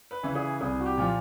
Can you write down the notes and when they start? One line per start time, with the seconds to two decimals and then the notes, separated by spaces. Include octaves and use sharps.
0.11 B4
0.23 C#3 E3
0.35 G#4
0.60 C2 G#4
0.80 F#4
0.85 G4
0.98 A#2 F3 F4